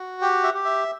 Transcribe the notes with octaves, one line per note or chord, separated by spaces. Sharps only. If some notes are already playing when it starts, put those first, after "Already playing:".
Already playing: F#4
G4 G5
E5
G4
E5